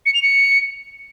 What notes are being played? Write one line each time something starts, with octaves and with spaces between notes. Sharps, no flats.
C#7
F7
C#7